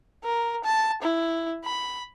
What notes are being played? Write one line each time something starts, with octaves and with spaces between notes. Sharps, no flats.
A#4
A5
E4
B5